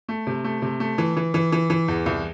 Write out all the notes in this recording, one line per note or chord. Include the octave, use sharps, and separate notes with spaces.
A3
C3
A3
C3
A3
E3
E3
E3
E3
E3
E2
C2